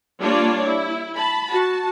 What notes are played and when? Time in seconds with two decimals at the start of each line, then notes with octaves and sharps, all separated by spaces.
0.19 G3 A#3 D4 F4 C#5 D5
0.65 E4
1.16 A5 B5
1.49 F#4 A5